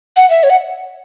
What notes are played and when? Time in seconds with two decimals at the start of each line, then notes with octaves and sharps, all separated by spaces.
0.16 F#5
0.30 E5
0.43 C#5
0.50 F#5